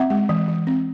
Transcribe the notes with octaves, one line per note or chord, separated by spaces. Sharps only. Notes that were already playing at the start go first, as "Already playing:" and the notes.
Already playing: C4 E5 F#5
G#3
E3
E3
C4